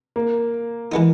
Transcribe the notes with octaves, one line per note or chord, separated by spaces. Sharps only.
A#3
E3 G#3 B3 D#4